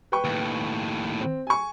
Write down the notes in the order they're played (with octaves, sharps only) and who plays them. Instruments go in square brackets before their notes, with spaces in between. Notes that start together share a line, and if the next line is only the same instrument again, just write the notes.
[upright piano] B4 G5 C#6
[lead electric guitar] D#2 A2
[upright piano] C4
G#5 C#6